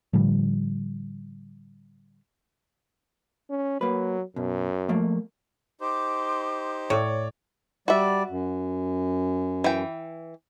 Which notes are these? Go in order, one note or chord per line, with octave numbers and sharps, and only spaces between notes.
A2 D3 F3 G3
C#4
F#3 A#3 B4
F#2 B2
F3 A3 A#3
D#4 G4 C5 C6 D6
A2 C#5 D5
G3 F#4 D5 E5
F#2
E3 G5